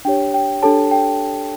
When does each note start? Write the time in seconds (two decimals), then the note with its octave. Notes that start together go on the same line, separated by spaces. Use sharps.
0.05 D4 G4 C#5 G5
0.34 G5
0.63 D4 G4 A4 C#5 A5
0.91 G5